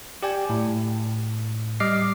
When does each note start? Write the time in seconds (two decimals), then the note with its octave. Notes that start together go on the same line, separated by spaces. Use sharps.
0.23 G4 D5 G5 G#5
0.50 A2
1.80 G3 D#5 D6 F6 C7